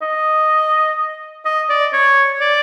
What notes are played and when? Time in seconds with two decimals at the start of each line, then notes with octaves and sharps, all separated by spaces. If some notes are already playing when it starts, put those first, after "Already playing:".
0.02 D#5
1.45 D#5
1.69 D5
1.93 C#5
2.41 D5